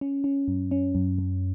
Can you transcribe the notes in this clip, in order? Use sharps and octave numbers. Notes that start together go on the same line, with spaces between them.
C#4
C#4
F#2
C#4
F#2
F#2